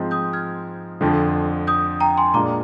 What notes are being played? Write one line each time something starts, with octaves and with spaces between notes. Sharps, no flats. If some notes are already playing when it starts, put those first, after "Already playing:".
Already playing: G#2 F3 G#3 C4
D#6 G6
F6 G#6
F2 D3 F3
D#6 G6
G5 A#5
G#5 C6
A#2 G#3 D4 F4 A#5 D6